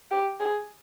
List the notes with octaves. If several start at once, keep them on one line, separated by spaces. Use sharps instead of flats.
G4
G#4